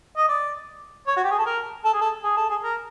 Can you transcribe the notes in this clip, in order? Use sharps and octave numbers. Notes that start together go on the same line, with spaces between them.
D#5
D5
C#5
F#4
G4
G#4
A4
A#4
A4
G#4
A4
G#4
A4
G#4
A#4